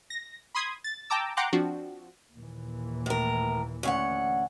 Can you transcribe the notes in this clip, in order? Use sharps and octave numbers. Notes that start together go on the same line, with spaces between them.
A#6
B5 C6 D#6 G#6
A6
G5 A5 A#5 D6 E6
F#5 G5 A#5 C6 D6 F#6
F3 C4 D4 F#4
D#2 A#2 E3
A2 A#4
D2 C#4 F#5